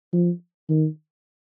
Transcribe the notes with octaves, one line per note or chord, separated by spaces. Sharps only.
F3
D#3